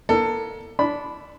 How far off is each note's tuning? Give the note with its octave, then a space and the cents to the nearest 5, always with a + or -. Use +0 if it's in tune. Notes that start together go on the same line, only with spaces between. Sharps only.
A#3 +35 A4 +20
D4 -15 B5 +5